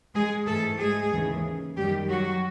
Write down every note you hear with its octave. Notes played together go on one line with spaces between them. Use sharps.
G#3 G#4
G#2 E3 A3 A4
G#3 G#4
D#2 C#3 E3
F#2 D#3 G3 G4
F#3 F#4